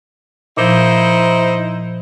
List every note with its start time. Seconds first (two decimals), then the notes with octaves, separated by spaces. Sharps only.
0.57 A#2 F3 D#4 E4 C5